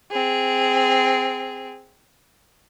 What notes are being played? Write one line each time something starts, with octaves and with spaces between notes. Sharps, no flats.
C4 G#4